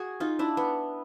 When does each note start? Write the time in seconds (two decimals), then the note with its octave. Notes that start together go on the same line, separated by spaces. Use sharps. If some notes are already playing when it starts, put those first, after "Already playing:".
Already playing: F#4 G#4
0.20 D#4 F4
0.39 D4 E4
0.57 B3